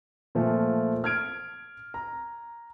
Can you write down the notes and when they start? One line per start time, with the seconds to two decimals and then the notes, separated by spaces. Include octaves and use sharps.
0.35 A#2 F3 A3
1.04 F6 G#6 D7
1.94 A#5